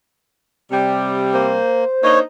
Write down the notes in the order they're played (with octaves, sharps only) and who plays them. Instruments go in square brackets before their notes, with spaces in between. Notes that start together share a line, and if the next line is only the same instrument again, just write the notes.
[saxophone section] C3 G3
[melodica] A#3 [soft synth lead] C5
[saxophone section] A#3 D4 D#4 [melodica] C#5